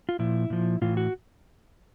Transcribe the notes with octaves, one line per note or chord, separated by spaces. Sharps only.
F4
A#2 F3 E4
A#2 F3
A2 E3 F4
F#4